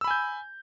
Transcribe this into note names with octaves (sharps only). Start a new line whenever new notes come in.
G#5 B5 E6 G6